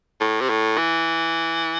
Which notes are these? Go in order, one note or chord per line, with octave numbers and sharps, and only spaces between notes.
A2
C3
A2
E3